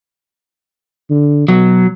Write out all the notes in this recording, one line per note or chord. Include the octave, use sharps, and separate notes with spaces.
D3
B2 F#3